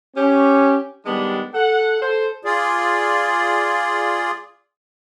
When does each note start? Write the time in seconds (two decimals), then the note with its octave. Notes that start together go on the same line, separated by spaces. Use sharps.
0.16 C#4 G4
1.06 D#3 G3 G#3 B3 D4
1.54 A4 F#5
2.01 A4 C5
2.45 F4 G#4 D5